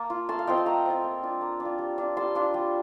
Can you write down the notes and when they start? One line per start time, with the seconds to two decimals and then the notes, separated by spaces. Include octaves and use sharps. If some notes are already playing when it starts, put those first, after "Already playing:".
Already playing: A#3 A5
0.10 F4
0.29 A3 A5 C6
0.39 F5
0.47 C4 F4 D#5 G5
0.57 F5 A5
0.66 A3 G5 A#5
0.86 C4 F4
1.04 A#3
1.23 D4 F4
1.41 A#3
1.60 D4
1.65 F4
1.78 G3
1.98 D4 F4
2.17 G3 A5 C6
2.35 D4 F4
2.54 G3